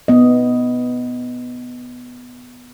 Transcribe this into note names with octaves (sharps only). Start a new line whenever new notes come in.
B3 D#5